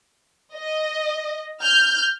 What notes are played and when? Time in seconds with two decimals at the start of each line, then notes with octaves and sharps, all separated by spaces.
0.54 D#5
1.62 F6 G6